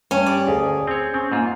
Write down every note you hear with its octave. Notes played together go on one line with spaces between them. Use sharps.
G2 C#4
G4 D5
D2 G#4
C4 C#5
C4 C#4
G#2 A#3 F4